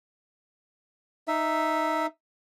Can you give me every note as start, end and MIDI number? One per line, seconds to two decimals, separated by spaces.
1.28 2.06 63
1.28 2.06 76